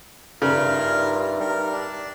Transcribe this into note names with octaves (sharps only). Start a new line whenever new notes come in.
G2 C#3 D#4 F4 A#4 D5 E5
G3 A#4
D4